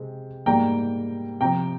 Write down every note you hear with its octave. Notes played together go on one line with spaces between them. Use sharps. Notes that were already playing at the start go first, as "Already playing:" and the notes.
Already playing: C3 G#3 C4
G#2 G3 A#3 G5 A#5
C3 F3 C4 G5 A#5